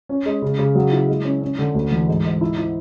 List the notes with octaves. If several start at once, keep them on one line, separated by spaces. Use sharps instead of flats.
C#4
G#3
C#3
C#3
F#3
E4
G#3
C#4
C#4
D3
D2
E3
G#2
G#2
E4
E4